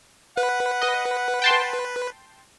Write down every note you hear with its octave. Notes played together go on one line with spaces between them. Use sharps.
B4 F#5
D#5
G5 A5 C6